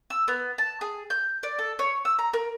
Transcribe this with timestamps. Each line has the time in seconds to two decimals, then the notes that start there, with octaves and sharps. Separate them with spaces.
0.10 E6
0.28 B3
0.58 A5
0.81 G#4
1.10 G6
1.43 D5
1.59 A4
1.79 C#5
2.05 E6
2.19 A#5
2.33 A#4